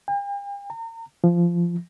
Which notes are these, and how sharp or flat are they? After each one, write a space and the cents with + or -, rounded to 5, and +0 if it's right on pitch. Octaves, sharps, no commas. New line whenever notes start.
G5 +45
A#5 -35
F3 -15